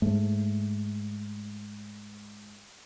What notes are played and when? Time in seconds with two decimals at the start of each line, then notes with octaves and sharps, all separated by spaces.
0.02 G#2 A3